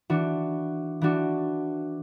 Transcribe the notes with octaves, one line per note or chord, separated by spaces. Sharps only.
E3 D4 F#4
E3 D4 F#4